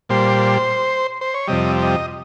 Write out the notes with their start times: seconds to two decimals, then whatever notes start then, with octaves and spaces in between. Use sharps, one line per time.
0.09 A#2 G3 C5
1.21 C5
1.34 C#5
1.48 F2 C3 G3 D#5
1.82 D#5